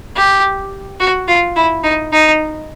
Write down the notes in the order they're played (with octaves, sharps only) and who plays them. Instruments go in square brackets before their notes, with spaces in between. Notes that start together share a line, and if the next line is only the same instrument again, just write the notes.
[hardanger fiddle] G4
F#4
F4
E4
D#4
D#4